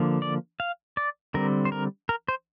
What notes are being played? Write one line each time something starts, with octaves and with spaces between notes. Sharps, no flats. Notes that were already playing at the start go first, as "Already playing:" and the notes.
Already playing: D3 F3 A#3
D5
F5
D5
D3 G3 C4 A#4
C5
A#4
A#4
C5